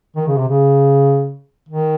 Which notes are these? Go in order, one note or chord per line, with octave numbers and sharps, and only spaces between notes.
D#3
C#3
C3
C#3
D#3